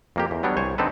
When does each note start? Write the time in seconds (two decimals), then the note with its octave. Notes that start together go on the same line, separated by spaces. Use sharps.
0.16 F2 A#3 G4
0.31 E2
0.43 F#3 G3 B3 D4 C#5
0.57 C2 C5 C#5 G#5
0.78 D3 C4 D#4 A4 B4